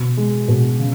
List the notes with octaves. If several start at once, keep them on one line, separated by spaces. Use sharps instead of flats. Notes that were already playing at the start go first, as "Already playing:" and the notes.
Already playing: B2
G#3
B2
C#3